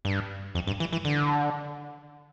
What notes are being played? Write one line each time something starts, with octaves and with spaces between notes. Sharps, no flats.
G2
F2
G2
E3
E3
D3